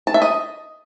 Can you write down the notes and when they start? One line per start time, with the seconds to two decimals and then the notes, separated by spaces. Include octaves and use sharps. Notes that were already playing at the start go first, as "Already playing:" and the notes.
0.07 A5
0.14 E5
0.22 D#5